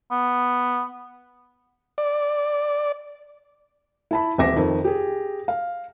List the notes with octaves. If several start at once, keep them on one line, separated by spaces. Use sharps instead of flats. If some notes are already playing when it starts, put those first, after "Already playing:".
B3
D5
E4 A5 B5
D#1 A1 C4 E5 D6 A#6
F2 D#3
G4 G#4
F5